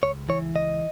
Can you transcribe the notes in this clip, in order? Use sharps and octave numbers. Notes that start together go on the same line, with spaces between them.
C#2 C#5
E3 C#5
C#2 D#5